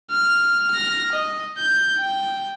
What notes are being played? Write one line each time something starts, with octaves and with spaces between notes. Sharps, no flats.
F6
F6 A#6
D#5
G6
G5